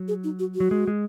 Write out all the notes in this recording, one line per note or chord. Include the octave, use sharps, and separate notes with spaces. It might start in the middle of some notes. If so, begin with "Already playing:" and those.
Already playing: F#3
G#4
D#4
F#4
F#4
F#3
G#3
G#3